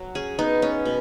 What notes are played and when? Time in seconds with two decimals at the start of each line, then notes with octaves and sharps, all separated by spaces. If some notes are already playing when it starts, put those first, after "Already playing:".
Already playing: F#3
0.15 C#4 G#4
0.39 B3 D#4
0.62 B3 C#4
0.85 B2